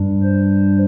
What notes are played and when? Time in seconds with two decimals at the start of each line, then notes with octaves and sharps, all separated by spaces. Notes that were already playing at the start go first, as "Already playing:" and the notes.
Already playing: G2 G3 D4
0.23 C5